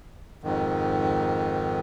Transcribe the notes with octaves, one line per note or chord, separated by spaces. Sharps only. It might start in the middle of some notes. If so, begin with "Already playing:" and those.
F2 G#2 D#3